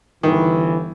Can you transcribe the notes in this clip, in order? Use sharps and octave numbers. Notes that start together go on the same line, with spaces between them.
G1 D#3 E3